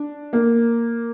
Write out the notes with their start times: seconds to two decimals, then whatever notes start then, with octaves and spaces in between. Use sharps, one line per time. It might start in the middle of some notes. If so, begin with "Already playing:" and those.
Already playing: D4
0.33 A#3